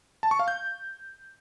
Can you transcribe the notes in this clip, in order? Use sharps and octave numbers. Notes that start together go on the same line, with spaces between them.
A5
C#6
F5
G6